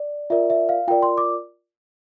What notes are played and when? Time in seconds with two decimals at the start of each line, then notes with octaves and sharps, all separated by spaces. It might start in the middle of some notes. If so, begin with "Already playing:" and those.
Already playing: D5
0.30 F4 A#4 D5 E5
0.50 E5
0.69 F5
0.88 F4 A#4 D5 G5
1.02 C6
1.18 D6